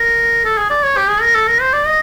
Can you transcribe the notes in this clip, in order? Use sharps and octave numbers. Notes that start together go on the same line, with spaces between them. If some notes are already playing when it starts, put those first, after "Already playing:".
Already playing: A#4
A4
G#4
D5
C#5
G4
G#4
A#4
A4
A#4
C5
D5
D#5